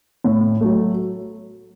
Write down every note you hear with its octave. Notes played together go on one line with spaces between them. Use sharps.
A2
F#3 A3